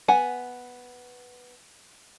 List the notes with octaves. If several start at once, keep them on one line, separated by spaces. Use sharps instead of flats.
B3 F#5 G#5